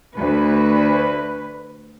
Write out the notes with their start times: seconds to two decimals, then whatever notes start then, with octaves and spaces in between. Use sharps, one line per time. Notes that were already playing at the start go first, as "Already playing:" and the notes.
0.16 D2 B4